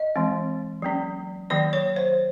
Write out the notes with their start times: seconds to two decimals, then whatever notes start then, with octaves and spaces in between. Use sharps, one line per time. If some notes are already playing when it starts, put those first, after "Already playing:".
Already playing: D#5
0.16 E3 G#3 C4
0.82 F#3 A#3 C#4
1.50 D#3 F#3 A#3 D5
1.73 C#5
1.96 C5